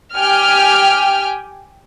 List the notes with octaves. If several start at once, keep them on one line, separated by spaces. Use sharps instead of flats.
G4 G5 G#5 F6